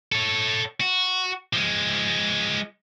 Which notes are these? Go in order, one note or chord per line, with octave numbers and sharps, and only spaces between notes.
A4 C#5
F#4
F3 G#3